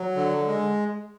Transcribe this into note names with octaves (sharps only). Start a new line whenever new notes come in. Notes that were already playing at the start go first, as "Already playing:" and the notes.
Already playing: F#3
D3
G#3